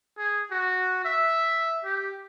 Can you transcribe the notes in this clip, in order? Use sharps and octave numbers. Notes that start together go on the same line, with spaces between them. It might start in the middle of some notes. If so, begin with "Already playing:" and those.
G#4
F#4
E5
G4